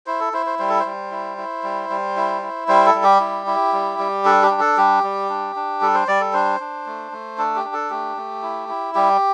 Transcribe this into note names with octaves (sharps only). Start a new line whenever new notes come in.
E4 C5
A4
E4 C5
C5
G3 C5
A4
C5
G3
E4
E4
G3
G3
E4
E4
G3 C5
A4
G3
G4
E4
E4
G3
G3
D4 A4
G4
D4
A4
G3 G4
G3
D4
D4
G3 A4
C5
G3 D5
A4
D4 C5
D4
A3
A3
D4 A4
G4
D4
A4
A3 G4
A3
E4
E4
G3 G4